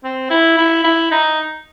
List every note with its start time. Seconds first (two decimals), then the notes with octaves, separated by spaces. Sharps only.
0.04 C4
0.30 E4
0.57 E4
0.84 E4
1.11 D#4